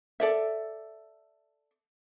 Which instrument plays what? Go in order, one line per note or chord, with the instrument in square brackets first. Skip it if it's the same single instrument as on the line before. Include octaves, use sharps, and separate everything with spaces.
[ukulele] A4 D5 E5